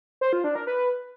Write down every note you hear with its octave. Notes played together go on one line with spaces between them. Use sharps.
C5
F4
D4
A#4
B4